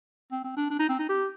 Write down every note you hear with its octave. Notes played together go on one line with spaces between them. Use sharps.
C4
C4
D4
D4
D#4
C4
D#4
G4